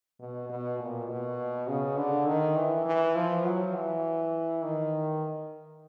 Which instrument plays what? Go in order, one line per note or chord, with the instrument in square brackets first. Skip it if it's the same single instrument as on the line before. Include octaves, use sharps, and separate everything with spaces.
[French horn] B2
B2
A#2
B2
C#3
D3
D#3
E3
E3
F3
F#3
E3
D#3